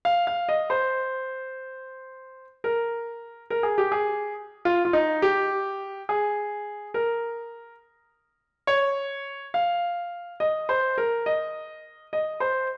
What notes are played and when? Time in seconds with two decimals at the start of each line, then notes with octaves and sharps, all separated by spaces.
0.05 F5
0.27 F5
0.49 D#5
0.70 C5
2.64 A#4
3.50 A#4
3.63 G#4
3.78 G4
3.92 G#4
4.65 F4
4.85 F4
4.93 D#4
5.22 G4
6.09 G#4
6.94 A#4
8.67 C#5
9.54 F5
10.40 D#5
10.69 C5
10.98 A#4
11.26 D#5
12.13 D#5
12.40 C5